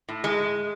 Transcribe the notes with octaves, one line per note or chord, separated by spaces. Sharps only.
A2
G#3